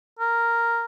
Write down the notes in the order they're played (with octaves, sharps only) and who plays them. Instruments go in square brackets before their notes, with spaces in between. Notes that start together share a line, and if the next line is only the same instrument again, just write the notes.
[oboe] A#4